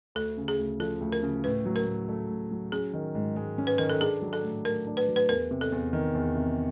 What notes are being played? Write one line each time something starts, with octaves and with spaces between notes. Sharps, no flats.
D2 A4
C#3
G#4
D2
F3 A4
D2
A#4
C#3
A2 B4
F#3
A#4
A2
A3
A2
F#3
C#4 G#4
D#3
G#2
G#3
C#4
B4
D#3 A#4
A4
D4 G#4
F#3
A4
A2
A3 A#4
D4
B4
F#3
B4
E2 A#4
C3
A4
E2
D#3
E2
C3